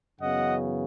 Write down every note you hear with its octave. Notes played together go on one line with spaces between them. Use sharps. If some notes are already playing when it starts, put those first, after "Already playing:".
F#2 C#3 E3 B3 D#5 F#5